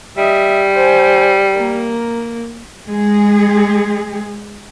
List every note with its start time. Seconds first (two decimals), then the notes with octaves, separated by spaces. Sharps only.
0.17 G3 D#5 E5
0.75 C5 G#5
1.54 A#3 A#4
2.87 G#3 G#4